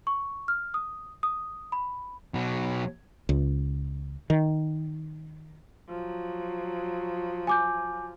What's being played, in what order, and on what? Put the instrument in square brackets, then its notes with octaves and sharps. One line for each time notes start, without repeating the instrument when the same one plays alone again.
[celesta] C#6
F6
D#6
D#6
B5
[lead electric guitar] B2 F#3
[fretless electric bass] C#2
D#3
[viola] F3 F#3
[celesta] G#5 D6 G6